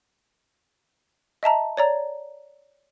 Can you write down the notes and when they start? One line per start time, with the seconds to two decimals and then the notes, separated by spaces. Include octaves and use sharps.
1.43 D#5 E5 A5 A#5
1.77 C#5 D5 A#5